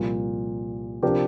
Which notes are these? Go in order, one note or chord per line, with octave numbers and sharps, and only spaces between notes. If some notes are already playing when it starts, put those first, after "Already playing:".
Already playing: C2 A#2 F3
C3 F3 D4 G4 A#4